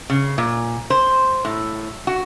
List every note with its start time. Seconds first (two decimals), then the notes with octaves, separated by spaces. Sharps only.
0.10 C#3
0.38 A#2
0.90 C5
1.45 A2
2.07 F#4